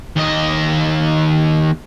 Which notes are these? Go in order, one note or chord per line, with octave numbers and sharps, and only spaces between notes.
D#2 D#5